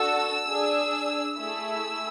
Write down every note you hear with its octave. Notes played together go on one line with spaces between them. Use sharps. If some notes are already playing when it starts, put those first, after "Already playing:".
Already playing: D4 F#4 A4 E6
D4 G#4
A3 E4 G#4 E6